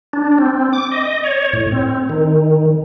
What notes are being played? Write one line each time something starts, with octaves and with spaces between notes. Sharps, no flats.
D4
C4
D6
D#5
C#5
A2
C4
D#3